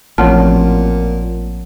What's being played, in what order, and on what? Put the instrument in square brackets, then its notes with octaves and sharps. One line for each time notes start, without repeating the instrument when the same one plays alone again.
[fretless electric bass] A1 [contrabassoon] A#2 [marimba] F3 C4 F6 [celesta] C#5 F#5 A5